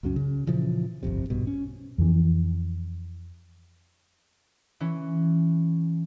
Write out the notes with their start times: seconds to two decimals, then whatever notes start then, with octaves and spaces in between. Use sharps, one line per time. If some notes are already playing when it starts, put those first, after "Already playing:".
0.03 C#2 F#2 F#3 C#4
0.16 C#3
0.47 A#2 C#3 E3 F3
1.03 G1 C2 F2 C3
1.30 A#1 G2 B2
1.47 C#4
1.98 F2 E3
4.80 E3 C#4